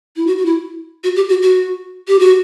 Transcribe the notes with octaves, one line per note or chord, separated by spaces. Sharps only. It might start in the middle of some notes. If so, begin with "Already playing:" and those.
E4
F#4
F#4
E4
F#4
G4
F#4
F#4
G4
F#4